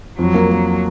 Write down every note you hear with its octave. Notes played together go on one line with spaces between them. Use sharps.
F2 F#3
A#3
A#3